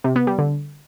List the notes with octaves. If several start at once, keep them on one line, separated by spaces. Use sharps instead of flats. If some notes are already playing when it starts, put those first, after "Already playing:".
C3
B3
G3
D3